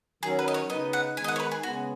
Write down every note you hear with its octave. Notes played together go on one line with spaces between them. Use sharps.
D#3 F#3 C#4 G#4
B4
D#5
C#5
C#3 B3 D#4 D#5
F#5
D#3 G#3 B3 D#4 G#5
D#5
F#5
C#5
B4
G#4
C#3 G#3 B3 F#4